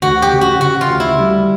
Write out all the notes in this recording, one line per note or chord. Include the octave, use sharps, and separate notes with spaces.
D2 F#4
G4
C#3
F#4
C#3 F#4
F4
D2
E4
G3